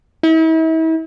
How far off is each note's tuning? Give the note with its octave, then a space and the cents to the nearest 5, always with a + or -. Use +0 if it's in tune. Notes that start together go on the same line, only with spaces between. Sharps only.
E4 -40